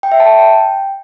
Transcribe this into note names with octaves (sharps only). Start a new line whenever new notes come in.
G5
E5
A5
G5